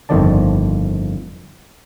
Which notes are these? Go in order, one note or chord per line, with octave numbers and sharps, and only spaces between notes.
G1 F2 D#3 F3 D5 A5